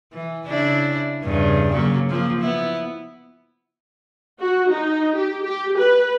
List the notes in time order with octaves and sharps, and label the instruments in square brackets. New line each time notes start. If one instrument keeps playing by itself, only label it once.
[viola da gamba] E3
C#3 D4 E4
E2 G2 C#3
C#3 F#3 A#3
F3 A#3 C4
B3 E4
[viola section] F#4
D#4
G4
G4
B4